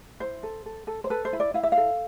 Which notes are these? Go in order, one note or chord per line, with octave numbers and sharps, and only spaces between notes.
E4 C5
A4
A4
A4
C5
A4 B4
C5
E4
D5
E4 F5
E5
A4 F5